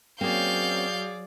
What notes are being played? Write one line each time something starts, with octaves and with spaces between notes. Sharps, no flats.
F#3 A#3 C4 C#4 G#4 D5 F5 G6